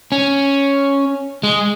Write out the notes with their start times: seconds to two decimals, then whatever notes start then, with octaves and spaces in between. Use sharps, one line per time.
0.12 C#4
1.43 G#3